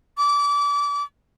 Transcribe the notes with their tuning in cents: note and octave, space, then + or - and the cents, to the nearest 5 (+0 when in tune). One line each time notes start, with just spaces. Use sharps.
D6 -30